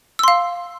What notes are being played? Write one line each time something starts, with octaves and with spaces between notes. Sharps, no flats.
F5 C6 E6